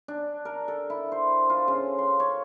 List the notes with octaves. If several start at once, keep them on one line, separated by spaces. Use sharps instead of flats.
D4
A#4
A4
E4
C5
F4
C#3
C6
C#5